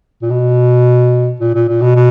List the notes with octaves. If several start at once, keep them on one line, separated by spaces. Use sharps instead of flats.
A#2
B2
A#2
A#2
A#2
B2
B2